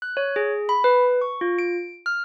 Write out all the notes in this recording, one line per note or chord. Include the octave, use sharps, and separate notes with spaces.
F#6
C#5
G#4
B5
B4
C#6
F4
D7
F6